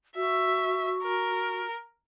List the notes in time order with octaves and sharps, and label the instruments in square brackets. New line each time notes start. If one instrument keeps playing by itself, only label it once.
[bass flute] F#4 [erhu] E5
[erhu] A#4